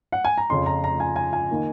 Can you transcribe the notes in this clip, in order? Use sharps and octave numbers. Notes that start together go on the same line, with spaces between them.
F#5
G#5
A#5
F2 C#3 F3 C6
A#5
A#5
G#5
G#5
G#5
D#3 A#3